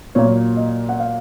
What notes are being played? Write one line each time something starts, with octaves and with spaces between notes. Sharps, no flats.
A#2 F#3 A#3 C#5
D#5
F#5
F5